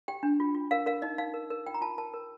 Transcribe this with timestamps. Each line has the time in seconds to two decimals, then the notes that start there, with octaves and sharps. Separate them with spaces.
0.08 G4 G5
0.23 D4
0.40 F4
0.54 F4
0.71 A#4 F5
0.86 A#4 F5
1.02 D#4 D#5
1.18 D#4 F5
1.34 A#4
1.50 A#4
1.66 F4 G5
1.74 A#5
1.81 F4 A5
1.98 A#4 A5
2.14 A#4